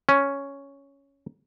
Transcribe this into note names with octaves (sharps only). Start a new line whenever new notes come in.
C#4